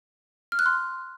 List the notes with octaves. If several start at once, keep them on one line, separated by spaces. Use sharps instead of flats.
F6
F#6
C6